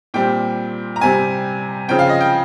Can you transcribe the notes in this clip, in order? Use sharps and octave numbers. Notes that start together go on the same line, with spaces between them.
A#2 G3 C4 G5
A#5
C3 G3 C4 G#5
C#3 F3 C4 G5
F5
D#5
G5